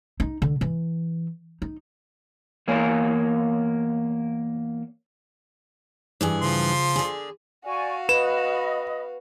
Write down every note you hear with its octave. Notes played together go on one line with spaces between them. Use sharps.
D#4
D3
E3
D#4
E2 A#3 C#5 F5 G#5
G2 E3 G#4
C#3 F3 C6
D3 G#4
F#4 D5 F5 G#5 C#6
B4 D#5 B5 D#6 E7